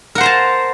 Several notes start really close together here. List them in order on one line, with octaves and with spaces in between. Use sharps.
A#4 F#5 C5 A#5 A5